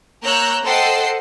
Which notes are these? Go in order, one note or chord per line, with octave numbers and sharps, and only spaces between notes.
A#3 C#5 A#5 E6 F#6 G6
A4 C5 D#5 F#5 G5 C7